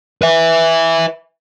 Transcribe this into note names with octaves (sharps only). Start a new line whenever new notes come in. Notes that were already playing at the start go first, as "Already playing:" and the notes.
B4 E5